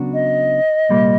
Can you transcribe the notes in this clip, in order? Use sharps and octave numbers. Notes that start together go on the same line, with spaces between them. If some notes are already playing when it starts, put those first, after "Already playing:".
Already playing: C#3 F#3 B3 D4 F#4
D#5
C2 A#2 G3 A#3